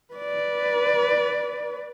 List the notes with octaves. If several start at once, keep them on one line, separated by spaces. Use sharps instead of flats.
B4 D5